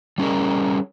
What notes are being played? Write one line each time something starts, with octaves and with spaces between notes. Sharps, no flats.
G3 C#4 G#4 A#4